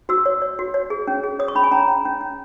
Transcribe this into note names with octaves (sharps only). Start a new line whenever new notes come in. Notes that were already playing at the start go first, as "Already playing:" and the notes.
F#4 E6
C#5
C#5
F#4
C#5
G#4
C#4
G#4
C#5 D#6
C#6
C#4 B5
G#5
C#4 A#5
C#4
C#4
C#4